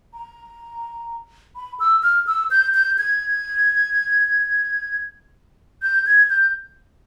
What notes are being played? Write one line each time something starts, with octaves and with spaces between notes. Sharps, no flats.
A#5
B5
E6
F6
E6
G6
G6
G#6
G6
G#6
G6